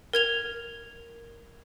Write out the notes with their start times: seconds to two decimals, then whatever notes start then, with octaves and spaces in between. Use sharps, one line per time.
0.13 A#4 G#6 F7